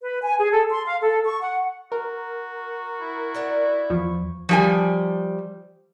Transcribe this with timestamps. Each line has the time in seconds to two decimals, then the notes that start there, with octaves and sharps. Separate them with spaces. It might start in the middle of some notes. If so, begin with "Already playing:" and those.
0.02 B4
0.23 G#5
0.38 G#4
0.51 A4
0.70 C6
0.85 F5
1.01 A4
1.24 C#6
1.41 F#5
1.92 F#4 A#4
3.01 E4
3.34 D4 D5 F#5
3.90 E2 F3 C#6
4.49 F3 G3 G#5